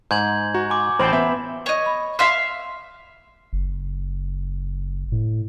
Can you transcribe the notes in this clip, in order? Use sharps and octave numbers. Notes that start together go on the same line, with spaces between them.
G#2 G6 G#6 F#7
F#4 A#5
G#5 C6 D6
A1 C5 G5 A5 B5 F#7
B3 E5
C#5 D#5
B5
E5 F5 C6 E6
F#1
A2